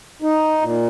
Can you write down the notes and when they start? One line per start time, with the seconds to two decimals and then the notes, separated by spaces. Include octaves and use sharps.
0.22 D#4
0.62 A#2